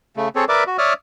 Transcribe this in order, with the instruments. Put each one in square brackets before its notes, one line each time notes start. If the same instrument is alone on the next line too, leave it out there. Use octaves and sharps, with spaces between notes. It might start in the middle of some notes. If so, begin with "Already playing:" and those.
[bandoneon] C#3 A3
C4 G#4 A4 C#5
A#4 B4 D5 E5 D6
F#4
C#5 D5 E5 D#6 F6